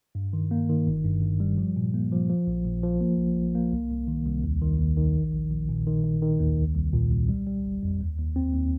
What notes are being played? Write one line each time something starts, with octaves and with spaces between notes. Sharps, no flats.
G2
D#3
A#3
D#3
G1
G2
G2
G3
F3
A#2
A#3
F3
F3
A#1
A#1
F3
A#3
A#1
A#1
A#3
C2
C2
D#3
C2
D#2
D#3
D#2
D#3
A#1
A#1
A#1
A#2
D#3
D#3
D#3
D#2
C2
C2
A#2
C2
G3
G3
G1
F2
D#2
D#2
C4
D#2